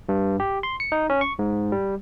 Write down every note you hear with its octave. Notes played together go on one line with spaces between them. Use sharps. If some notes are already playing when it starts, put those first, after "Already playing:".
G2
G4
C6
C#7
D#4
C#4
C#6
G#2
G3